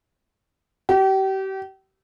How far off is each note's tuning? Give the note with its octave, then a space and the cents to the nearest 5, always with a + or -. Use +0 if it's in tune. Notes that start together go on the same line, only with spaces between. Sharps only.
G4 -35